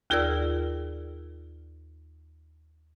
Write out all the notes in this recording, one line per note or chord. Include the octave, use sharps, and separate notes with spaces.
D#2 F4 G#4 A#4 D5 E6